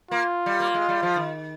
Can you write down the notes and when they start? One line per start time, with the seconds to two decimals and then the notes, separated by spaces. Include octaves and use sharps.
0.11 A#3 F4
0.46 G3
0.60 A#3
0.74 G#3
0.89 G3
1.03 F3
1.16 D#3